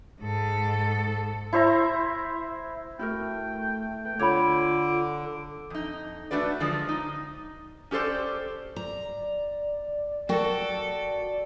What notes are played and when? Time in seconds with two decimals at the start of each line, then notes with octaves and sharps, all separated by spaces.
0.21 G#2 A4
1.53 E4 C5 E5 A#5
2.99 A3 E4 F#4 A#4 G5
4.05 B4 G5
4.19 D3 F4 C#5 B5 D6
5.70 F2 D#4
6.31 A3 D4 F#4 B4 D5
6.60 D3 F3 G#3
6.89 D#4
7.91 C#4 G4 A4 C5 D5
8.76 D5 A#5
10.29 F#4 A4 A#4 G5